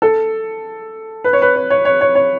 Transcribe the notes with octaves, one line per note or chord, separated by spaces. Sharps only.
A4
B4
C#5
B4
C#5
C#5
C#5
C#5
C#5